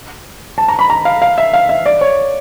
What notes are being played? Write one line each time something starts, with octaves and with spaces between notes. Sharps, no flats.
A5
A#5
B5
A#5
F5
F5
E5
F5
E5
D5
C#5